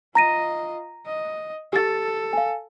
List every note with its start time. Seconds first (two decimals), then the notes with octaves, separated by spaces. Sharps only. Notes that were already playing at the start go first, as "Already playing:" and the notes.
0.15 F4 D#5 A#5 A#6 D#7
1.06 D#5
1.73 G4 A4 A6
2.33 F5 G#5